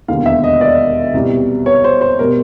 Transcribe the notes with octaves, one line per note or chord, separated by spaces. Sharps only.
E1 D#2 D3 F5
E5
D#5
D5
C2 B2 G3
C#5
C5
C5
B2 G3 A#4